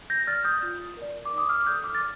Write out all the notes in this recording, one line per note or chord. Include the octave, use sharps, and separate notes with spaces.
G6 A#6
D5 F6 A6
D#6 G6
F4
A#4 D5
D6
D#4
D#6
D6 F6
A4 D5 D#6 G6
D6 F6
A6